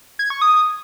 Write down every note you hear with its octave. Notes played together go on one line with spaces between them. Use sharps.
G#6
C#6
D#6